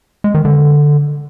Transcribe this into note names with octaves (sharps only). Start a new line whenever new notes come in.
G#3
D#3
D3